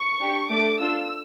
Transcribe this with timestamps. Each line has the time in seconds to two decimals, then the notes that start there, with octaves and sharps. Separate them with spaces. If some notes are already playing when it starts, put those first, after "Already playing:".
Already playing: C#6
0.21 D4 G4
0.51 A3 D4 A4 D6
0.80 D4 F4 A4 E6